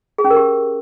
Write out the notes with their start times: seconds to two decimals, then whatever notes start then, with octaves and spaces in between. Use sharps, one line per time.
0.18 G#4
0.24 C#4
0.31 A#4
0.37 G4